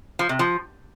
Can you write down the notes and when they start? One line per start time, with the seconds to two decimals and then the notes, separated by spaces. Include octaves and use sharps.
0.19 F3
0.29 C3
0.39 F3